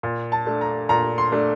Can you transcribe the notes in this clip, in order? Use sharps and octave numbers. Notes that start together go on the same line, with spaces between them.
A#2
A5
A3 D4
A#5
A#2 A#5
C6
A3 D4